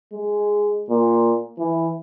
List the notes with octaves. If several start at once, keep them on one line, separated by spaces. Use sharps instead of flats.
G#3
A#2
E3